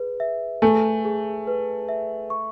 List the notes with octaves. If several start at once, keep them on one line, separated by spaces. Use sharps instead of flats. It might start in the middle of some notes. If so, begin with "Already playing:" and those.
Already playing: G#4 B4
E5
A3 G#5
G#4
B4
E5
C#6